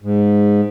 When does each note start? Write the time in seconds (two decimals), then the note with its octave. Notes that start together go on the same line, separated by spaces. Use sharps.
0.02 G#2